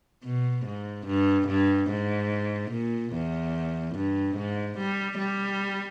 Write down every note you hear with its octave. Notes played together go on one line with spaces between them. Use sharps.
B2
G#2
G2
G2
G#2
A#2
E2
G2
G#2
G3
G3